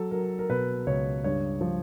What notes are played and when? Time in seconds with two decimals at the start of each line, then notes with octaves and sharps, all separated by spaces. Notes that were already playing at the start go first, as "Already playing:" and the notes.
Already playing: F#3 A4
0.11 F#3 A#4
0.39 A#4
0.49 B2 B4
0.87 C#2 C#5
1.24 G2 C#5
1.61 F3